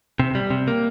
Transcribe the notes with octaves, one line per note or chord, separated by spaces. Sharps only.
C3
G3
C3
A#3